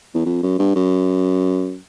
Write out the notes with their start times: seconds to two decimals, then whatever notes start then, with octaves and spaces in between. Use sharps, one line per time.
0.15 E2
0.26 F2
0.43 F#2
0.59 G2
0.75 F#2